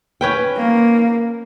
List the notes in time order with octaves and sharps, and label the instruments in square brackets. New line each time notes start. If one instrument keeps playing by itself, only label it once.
[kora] C#4 B4 G5
[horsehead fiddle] A#3